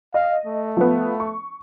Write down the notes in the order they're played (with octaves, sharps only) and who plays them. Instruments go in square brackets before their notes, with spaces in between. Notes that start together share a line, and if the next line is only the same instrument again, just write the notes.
[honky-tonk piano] D#5 [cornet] F5
[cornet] A3
[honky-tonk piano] F3 B3
C#6